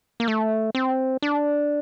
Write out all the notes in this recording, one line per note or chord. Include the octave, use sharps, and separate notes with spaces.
A#3
A3
C4
D4